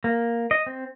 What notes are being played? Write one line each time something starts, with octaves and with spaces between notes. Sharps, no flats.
A#3
D#5
C4